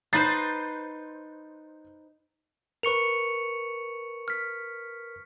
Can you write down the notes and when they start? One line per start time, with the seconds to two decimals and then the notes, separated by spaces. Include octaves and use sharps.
0.13 D#4 B4 C5 A6 C7
2.83 A#4 B4 C#6 C#7 F7
4.28 F6 B6